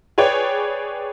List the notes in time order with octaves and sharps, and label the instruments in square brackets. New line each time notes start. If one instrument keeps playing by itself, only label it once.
[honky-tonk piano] G#4 B4 C#5 D5 G5